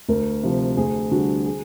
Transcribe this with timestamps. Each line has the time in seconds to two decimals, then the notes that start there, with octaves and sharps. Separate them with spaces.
0.09 D2 A#4
0.43 C3 F3
0.77 D2 G#4
1.11 D3 G3 F#4
1.45 G#4